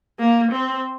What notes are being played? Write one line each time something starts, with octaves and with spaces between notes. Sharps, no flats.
A#3
C4